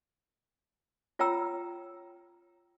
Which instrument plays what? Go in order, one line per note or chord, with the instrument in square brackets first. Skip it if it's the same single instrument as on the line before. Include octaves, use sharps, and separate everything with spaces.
[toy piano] F4 C#5 G5 A#5 E6